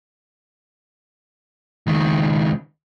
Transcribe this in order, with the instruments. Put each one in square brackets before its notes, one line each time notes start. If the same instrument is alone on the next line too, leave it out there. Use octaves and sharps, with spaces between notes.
[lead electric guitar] C#2 D#3